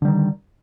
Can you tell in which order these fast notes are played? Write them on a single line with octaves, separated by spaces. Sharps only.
D3 G3 D#3